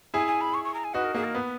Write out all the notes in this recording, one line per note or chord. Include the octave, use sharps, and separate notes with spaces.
E4 G#4 G#5
G#5
B5
C#6
C#6
A#5
G#5
D#4 F#4 B4
A#4
A#3 G#4
A#4
B3 B4